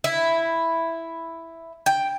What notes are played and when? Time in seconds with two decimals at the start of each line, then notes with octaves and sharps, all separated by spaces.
0.04 E4
1.86 G5